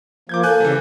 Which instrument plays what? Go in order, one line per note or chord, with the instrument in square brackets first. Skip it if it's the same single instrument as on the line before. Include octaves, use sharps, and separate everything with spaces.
[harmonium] F3 A#3 [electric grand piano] D6 G6 G#6
[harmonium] A#3 [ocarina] A4 [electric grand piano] G#5 F#6 G6
[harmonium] C#3 [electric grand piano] E3 G3